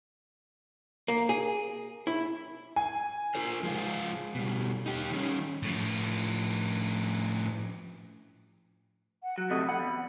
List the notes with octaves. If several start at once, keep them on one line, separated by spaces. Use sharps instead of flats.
A#3
G#4
E4
G#5
F4 A#4 C5
F3 G#3 F4
B2 G3
D#4 G4
D#3 G3 C#4
A2 F3
F#5
F#3 F#6
D2 C3 A4 D#5
F2 F#5 B5
E2